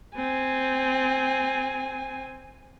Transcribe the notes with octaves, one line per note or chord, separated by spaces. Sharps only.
C4 G#5